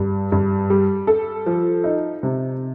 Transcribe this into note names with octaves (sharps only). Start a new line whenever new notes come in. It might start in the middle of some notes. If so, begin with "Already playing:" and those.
Already playing: G2
G2
G3
A4
F3
D#4
C3